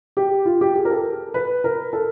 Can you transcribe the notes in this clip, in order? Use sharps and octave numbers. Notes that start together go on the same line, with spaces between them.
G4
F4
G4
G#4
A#4
A4
B4
A#4
A4